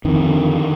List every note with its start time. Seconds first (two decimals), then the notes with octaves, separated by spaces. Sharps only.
0.05 F2 D#3
0.27 D3